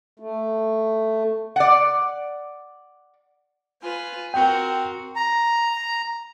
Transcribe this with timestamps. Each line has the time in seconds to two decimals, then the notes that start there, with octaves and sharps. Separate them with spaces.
0.19 A3
1.56 D5 F#5
3.82 F4 B4 G#5
4.34 C4 F#4 A#4 G5
5.16 A#5